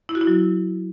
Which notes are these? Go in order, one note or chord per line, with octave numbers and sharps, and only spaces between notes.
E4
F#4
E4
F#3